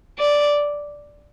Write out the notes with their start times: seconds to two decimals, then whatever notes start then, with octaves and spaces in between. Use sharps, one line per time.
0.19 D5